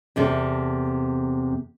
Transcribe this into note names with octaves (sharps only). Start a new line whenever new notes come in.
E2 C3 A4